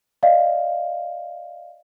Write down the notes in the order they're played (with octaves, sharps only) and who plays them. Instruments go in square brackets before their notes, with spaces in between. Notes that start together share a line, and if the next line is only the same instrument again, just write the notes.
[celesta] D5 D#5 F5